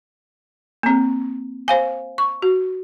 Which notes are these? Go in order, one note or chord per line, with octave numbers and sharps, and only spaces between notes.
A#3 C4
C5 F5 G#5
C#6
F#4